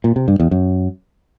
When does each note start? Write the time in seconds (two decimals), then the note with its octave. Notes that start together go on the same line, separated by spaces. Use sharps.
0.04 A#2
0.16 C3
0.28 G2
0.40 E2
0.51 F#2